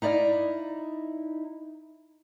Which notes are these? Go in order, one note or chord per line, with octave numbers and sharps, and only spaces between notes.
D#4 E4 D5 D#5 F5